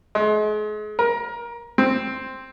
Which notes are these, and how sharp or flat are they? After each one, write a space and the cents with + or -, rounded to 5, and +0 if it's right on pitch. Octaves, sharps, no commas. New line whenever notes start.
G#3 +40
A#4 +20
C4 +5